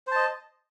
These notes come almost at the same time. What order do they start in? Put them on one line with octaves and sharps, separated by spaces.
C5 A5 D#5